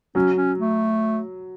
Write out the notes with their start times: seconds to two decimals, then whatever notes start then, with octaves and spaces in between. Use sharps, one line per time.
0.15 F#3 C#4
0.37 C#4
0.59 A3